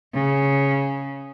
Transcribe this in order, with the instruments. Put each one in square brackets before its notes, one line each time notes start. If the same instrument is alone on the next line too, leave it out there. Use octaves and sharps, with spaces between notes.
[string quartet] C#3